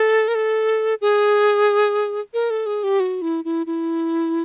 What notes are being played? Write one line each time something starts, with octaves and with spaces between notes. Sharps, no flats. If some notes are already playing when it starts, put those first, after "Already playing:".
Already playing: A4
A#4
A4
G#4
A#4
A4
G#4
G4
F#4
E4
E4
E4